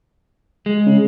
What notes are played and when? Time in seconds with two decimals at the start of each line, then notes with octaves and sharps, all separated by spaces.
0.66 G#3
0.86 C#3